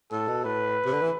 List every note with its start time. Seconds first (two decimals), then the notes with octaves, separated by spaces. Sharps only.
0.12 A2 A4
0.28 B2
0.44 A2 B4
0.85 C3
0.93 D3
1.02 E3